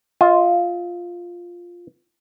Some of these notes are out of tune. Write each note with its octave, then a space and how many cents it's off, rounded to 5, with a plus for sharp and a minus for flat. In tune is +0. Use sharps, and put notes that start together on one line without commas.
F4 +5 D#5 +45